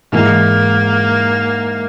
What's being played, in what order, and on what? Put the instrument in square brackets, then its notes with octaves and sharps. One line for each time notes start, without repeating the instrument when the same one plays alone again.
[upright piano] G#2 E3 G#3 [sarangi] A#3